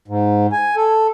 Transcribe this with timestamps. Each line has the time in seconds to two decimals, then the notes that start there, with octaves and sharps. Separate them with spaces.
0.08 G#2
0.52 G#5
0.76 A4